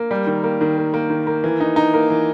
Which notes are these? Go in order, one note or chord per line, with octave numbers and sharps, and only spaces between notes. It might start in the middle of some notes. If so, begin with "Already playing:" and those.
Already playing: A#3
G3
D#3
A#3
D#3
A#3
A#3
D#3
A#3
E3
D#4
D#4
A#3
E3